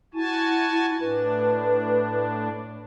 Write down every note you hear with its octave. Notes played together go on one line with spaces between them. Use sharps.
E4 F#4 G#5 A5
A2 D4 B4